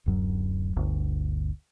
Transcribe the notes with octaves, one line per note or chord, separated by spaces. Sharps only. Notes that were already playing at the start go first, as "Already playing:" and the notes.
D1 F#2 F#3
G1 D2